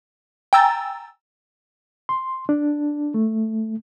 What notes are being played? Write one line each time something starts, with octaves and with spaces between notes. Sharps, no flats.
G5 G#5 A#5 E6 A6
C6
D4
A3